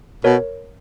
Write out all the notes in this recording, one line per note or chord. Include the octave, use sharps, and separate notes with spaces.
B2 A#4 C#5